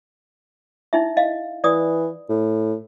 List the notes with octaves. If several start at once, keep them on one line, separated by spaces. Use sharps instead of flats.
D#4 E4 E5
D#5 F5
E3 D5 D#6
A2